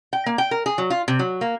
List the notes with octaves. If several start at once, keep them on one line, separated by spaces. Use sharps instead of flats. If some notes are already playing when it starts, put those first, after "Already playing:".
G5
A#3
G5
A#4
G#4
F#3
F4
C3
F#3
A#3